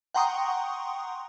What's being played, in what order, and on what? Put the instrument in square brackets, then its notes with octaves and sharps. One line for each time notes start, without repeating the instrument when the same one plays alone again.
[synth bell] F#5 G5 A#5 C6 C#6 D#6